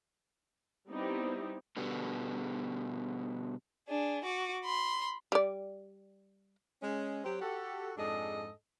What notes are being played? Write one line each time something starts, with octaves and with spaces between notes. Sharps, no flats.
G3 B3 C4 D#4 E4 G4
B2 D3 G3 B3
D4 G#4
F#4 D6
B5 C6
G3 D5
G#3 C#4
F#3 C4 G4
F#4 G4 A4
F2 G#2 D4 G#4 A4 D#5